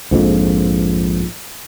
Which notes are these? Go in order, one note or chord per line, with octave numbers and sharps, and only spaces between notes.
A#1 F2 G#2